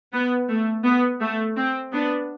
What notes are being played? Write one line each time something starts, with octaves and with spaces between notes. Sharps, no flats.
B3
A3
B3
A3
C4
B3 D4